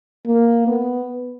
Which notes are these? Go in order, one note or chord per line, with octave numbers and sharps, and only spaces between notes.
A#3
B3